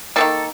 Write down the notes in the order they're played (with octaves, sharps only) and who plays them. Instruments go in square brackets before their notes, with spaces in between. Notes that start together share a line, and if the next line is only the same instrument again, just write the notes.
[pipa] D#3 G3 A#3 A4